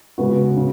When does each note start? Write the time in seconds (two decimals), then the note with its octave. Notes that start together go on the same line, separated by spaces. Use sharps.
0.18 C#3 G#3 B3 F#4 B4
0.56 C#3